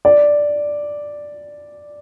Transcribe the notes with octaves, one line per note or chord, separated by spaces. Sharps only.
D5